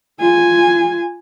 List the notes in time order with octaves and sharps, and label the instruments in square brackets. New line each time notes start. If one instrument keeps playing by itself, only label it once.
[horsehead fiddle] F4 G#5